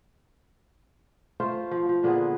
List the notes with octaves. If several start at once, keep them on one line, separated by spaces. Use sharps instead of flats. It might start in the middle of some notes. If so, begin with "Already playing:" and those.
A3 F4 C5
F3
F3
A#2 D3 B3 G#4